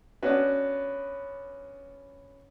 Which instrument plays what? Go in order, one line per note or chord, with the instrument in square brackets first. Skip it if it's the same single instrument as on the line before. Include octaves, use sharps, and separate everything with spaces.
[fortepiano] B3 C#4 D4 F#4 B4